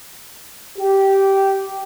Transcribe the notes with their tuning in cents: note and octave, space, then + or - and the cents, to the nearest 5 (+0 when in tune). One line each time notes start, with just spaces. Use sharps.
G4 -10